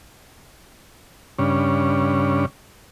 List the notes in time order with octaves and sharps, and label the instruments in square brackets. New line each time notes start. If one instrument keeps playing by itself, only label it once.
[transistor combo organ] G2 C#3 C#4 D4